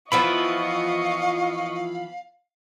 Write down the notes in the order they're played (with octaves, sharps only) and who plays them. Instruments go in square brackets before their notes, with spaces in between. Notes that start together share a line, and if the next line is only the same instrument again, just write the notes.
[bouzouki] E3 F3 B3 [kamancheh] D#5 C#6 [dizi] F5 [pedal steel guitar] B5